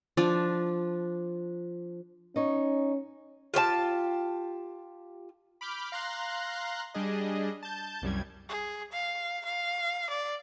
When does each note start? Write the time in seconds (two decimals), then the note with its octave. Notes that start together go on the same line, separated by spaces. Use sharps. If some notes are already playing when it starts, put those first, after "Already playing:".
0.17 F3 D4
2.36 C#4 D#4 C#5
3.54 F4 G4 C5 A5
5.61 B5 D6 F6 G6
5.92 F5 A#5 C6 F#6
6.94 G3 D4 G#4 D#5
7.63 A5 G6
8.02 C2 F#2 G3 G#6
8.48 G#4
8.93 F5
9.45 F5
10.10 D5